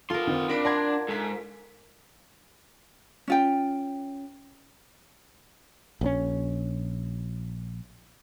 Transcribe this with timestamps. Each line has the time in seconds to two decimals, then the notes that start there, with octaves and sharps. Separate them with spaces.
0.10 B3 F4 A4 A#4 C6
0.27 D#3 C4
0.49 D4 A#4 B5
0.65 D5 F#5 A5 A#5 C6 G#6
1.09 G#2 A4 B6
3.28 C#4 F4 G5
6.01 A#1 C#3 C#4